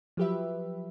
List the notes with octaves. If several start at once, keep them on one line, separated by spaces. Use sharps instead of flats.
F3 F#3 G4 B4 E5